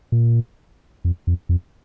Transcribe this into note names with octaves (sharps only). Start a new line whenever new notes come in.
A#2
F2
F2
F2